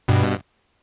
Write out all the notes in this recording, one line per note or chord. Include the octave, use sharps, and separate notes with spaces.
G2 B2